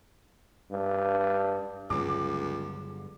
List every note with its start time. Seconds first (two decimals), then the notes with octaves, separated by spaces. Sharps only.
0.71 G2
1.90 C#2 G2 D3 F#3 D6